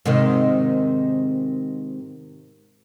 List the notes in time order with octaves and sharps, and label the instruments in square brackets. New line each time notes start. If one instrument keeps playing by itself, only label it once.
[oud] G#2 C3 D#3